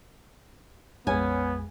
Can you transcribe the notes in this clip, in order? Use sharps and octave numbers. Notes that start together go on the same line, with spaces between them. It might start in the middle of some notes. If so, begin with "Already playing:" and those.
A#1 F2 G#3 B3 C#4 G#5